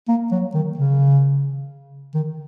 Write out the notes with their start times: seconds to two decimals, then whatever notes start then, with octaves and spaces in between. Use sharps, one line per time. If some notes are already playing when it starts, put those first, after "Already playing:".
0.08 A#3
0.31 F#3
0.54 D#3
0.77 C#3
2.14 D#3